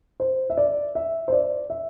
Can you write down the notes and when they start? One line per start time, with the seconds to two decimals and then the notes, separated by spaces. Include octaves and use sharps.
0.20 C5
0.50 E5
0.57 D5
0.95 E5
1.28 C5
1.32 D5
1.70 E5